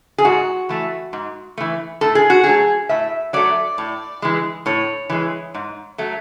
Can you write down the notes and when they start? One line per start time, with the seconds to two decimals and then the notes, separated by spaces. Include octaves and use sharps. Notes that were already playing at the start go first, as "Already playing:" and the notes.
0.18 G#4
0.25 G#2 F#4
0.69 E3 A3
1.13 G#2
1.58 E3 A3
2.01 A2 A4
2.15 G#4
2.30 F#4
2.44 F#3 A3 G#4
2.89 A2 E5
3.33 F#3 A3 D5
3.78 A2
4.22 E3 G#3
4.66 A2 C#5
5.10 E3 G#3
5.54 G#2
5.98 F#3 A3